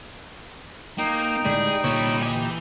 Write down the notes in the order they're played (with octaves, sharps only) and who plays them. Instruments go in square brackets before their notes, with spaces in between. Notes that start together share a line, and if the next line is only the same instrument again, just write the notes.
[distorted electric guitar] A#3 [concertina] D#4 G5
[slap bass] A2 D3 G#3 [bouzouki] G3 [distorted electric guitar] G#4
[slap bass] A#2 D3 [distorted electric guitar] G3 E4 [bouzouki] C#5
[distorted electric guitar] E3 G#5 [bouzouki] D#4 G4